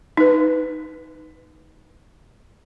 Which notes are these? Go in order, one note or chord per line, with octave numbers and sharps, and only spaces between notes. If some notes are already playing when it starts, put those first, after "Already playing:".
D#4 B4